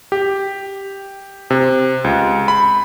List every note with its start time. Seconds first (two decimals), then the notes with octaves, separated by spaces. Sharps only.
0.12 G4
1.50 C3
2.04 C#2
2.48 B5